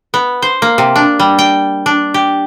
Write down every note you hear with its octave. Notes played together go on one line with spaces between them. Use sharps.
B3
C5
A#3
C3
D4
G3
G5
D4
G4